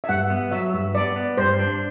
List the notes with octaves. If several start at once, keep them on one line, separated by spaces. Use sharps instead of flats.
E5
G2 F#5
B3
F#3 E5
G2
B3 D5
B3
G2 C5
D4